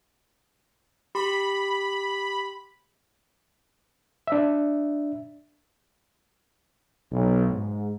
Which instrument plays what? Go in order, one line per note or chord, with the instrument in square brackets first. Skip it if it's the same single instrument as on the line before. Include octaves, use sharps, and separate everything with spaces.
[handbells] G4 C6 [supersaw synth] B5
[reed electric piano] D4 E5
[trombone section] B1
G#2